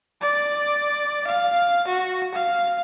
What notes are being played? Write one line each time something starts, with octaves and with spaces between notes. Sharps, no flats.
D5
F5
F#4
F5